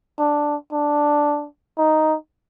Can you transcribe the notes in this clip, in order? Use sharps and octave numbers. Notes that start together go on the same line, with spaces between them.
D4
D4
D#4